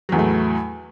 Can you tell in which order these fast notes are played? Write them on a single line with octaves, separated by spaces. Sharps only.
F#3 E2 A2 A3